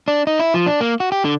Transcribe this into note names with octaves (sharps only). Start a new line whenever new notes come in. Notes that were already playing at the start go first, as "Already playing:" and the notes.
D4
D#4
E4
F3
D4
A#3
F#4
G4
D3